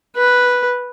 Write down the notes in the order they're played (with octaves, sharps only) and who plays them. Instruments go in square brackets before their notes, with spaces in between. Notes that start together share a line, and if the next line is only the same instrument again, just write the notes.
[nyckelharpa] B4